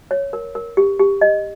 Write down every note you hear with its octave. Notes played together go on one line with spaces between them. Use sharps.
C#5
A#4
A#4
G4
G4
G4 D#5